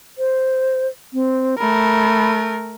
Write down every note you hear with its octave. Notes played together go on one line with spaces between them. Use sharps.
C5
C4
A3 A#4 B5